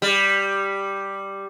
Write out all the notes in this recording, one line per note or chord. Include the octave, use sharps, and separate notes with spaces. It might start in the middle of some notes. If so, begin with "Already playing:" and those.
G3